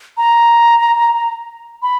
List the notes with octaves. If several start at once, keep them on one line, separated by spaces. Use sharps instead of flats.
A#5
B5